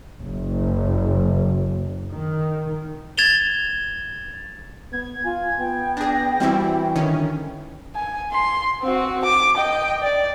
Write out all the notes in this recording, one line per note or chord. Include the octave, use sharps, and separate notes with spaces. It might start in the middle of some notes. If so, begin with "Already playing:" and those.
F#1
D#3
G#6 A6 E7 F7 G7
B3 G#6
F4 G#5
B3 G5
D4 G#4 A#6
E3 G3 C4 E4 F#4
D3 D#3 C#4
G#5
C6
C4 F#4
D6
D#5 G5
D5